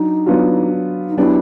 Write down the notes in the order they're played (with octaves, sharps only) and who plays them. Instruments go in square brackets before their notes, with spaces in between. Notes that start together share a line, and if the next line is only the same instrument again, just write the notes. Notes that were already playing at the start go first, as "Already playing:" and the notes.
Already playing: [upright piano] F#3 D4 [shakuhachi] D#4
[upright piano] F#3 B3 D4 F4
[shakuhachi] D#4
[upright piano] F#3 B3 D4 G4 [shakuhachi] E4